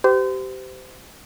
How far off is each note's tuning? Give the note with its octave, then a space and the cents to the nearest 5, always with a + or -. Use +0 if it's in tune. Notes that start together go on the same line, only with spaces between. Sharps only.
G4 -25 C5 -35